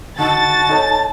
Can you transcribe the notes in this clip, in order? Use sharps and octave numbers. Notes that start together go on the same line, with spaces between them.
D3 D#4 F#4 A5 A6
D#4 A4 C#5